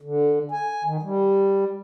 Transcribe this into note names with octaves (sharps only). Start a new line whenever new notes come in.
D3
G#5
D#3
G3